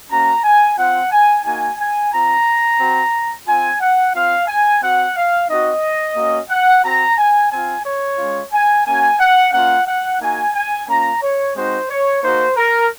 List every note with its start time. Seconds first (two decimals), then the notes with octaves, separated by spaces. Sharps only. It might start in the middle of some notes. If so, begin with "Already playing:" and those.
0.10 A#3 C#4 F#4 A#5
0.44 G#5
0.77 C4 F4 F#5
1.11 G#5
1.45 A#3 D#4 F#4 G#5
1.79 G#5
2.13 C4 F4 A#5
2.79 C4 F#4
3.47 C4 F4 G#5
3.80 F#5
4.14 C4 F4 F5
4.47 G#5
4.82 C4 F#4 F#5
5.16 F5
5.49 C4 D#4 F#4 D#5
6.16 A#3 C#4 F#4
6.49 F#5
6.83 C4 F#4 A#5
7.18 G#5
7.51 C4 F4 G#5
7.84 C#5
8.18 G#3 C#4 F4
8.52 G#5
8.85 A#3 C#4 F#4 G#5
9.19 F#5
9.53 A#3 C#4 F4 F#5
9.87 F#5
10.20 A#3 D#4 F#4 G#5
10.54 G#5
10.87 A#3 C#4 F4 A#5
11.22 C#5
11.55 G#3 C4 D#4 F#4 C5
11.89 C#5
12.22 A#3 D#4 F#4 C5
12.56 A#4